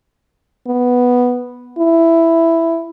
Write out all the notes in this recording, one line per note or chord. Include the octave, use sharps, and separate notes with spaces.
B3
E4